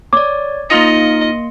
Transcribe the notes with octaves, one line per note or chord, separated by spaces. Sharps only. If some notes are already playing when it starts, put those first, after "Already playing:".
C#5 D5 D6
A#3 D#4 F4 D#5 C6 C#7